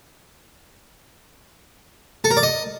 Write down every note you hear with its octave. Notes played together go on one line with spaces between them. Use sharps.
A4
A#4
D5
D#5